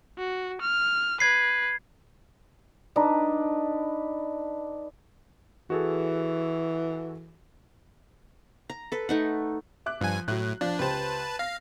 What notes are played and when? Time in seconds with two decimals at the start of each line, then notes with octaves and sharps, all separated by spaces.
0.18 F#4
0.61 F6
1.20 B4 G#6 C7
2.96 D4 D#4 B4
5.70 E3 F#4 G#4 A4
8.70 A#5
8.92 A4 B4
9.09 A3 D#4 F#5
9.86 E5 D6 F#6
10.01 G2 F3 G#5
10.28 A2 F#3 F#6
10.61 F3 D4
10.79 C#2 G4 B4 C5 A5
11.39 F5 A#6